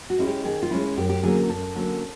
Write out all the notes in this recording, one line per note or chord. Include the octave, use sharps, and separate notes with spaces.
F#4
G#3 C#4 E4
G4
D#3 G#4
F4
G#3 C#4 E4
F#2 G4
G4
D3 F#3 A#3 C#4 G#4
F#2 A4
D3 F#3 A#3 C#4